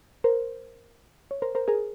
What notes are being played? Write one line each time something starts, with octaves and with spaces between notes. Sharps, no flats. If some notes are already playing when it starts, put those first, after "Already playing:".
A#4 C5
C#5
A#4 C5
A#4 C5
G#4 A#4